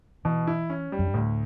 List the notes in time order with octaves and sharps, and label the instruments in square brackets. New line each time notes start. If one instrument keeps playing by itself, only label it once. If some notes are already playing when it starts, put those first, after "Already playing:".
[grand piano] B2 [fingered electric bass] E3
[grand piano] E4
C#4
G3
[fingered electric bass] F#2
G2
[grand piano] D2 [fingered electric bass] A2